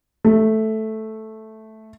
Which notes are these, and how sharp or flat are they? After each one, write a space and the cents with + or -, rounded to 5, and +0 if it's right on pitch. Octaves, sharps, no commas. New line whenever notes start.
A3 -5